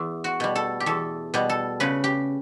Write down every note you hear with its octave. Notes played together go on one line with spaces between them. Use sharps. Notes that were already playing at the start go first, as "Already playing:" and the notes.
Already playing: E2
F#4
B2 G3
A4
G4
E2 A4
B2 G3
A4
C#3 B4
G4